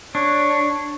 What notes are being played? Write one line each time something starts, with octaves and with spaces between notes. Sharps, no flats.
D4 C#5